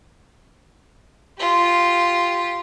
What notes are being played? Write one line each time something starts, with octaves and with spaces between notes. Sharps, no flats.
F4 G4